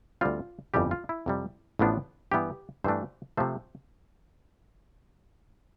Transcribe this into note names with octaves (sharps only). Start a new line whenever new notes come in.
D2 D3 G3 C4 F4
G1 F2 E3 G3 G4
F4
E4
F2 C3 G3
A1 A2 F3 B3 D4
G2 E3 B3 G4
G2 E3 A3 D4 C5
C3 F3 A3 C5